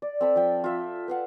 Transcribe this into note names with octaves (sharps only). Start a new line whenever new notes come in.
D5
C4 A4 B5
F3 G5
F4 E5 B5
B4 F5 F#5